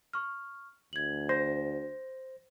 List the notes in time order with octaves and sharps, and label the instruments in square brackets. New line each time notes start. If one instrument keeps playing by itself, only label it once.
[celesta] C#6 F6
[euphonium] D2 [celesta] G#6 F#7
[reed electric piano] C5 [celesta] A#6